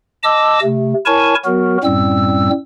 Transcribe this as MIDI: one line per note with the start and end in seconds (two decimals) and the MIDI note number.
0.23 0.59 75
0.23 0.59 81
0.23 0.59 86
0.23 0.59 88
0.63 0.93 48
0.63 0.93 57
1.06 1.35 64
1.06 1.35 70
1.06 1.35 73
1.06 1.35 80
1.06 1.35 81
1.06 1.35 85
1.45 1.77 54
1.45 1.77 59
1.45 1.77 66
1.45 1.77 70
1.84 2.50 42
1.84 2.50 45
1.84 2.50 55
1.84 2.50 60
1.84 2.50 88